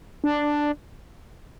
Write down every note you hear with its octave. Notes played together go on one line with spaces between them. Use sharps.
D4